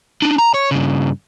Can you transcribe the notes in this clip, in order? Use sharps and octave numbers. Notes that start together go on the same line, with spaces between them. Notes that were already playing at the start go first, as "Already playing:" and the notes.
D4 D#4
A#5
C#5
G2 C#3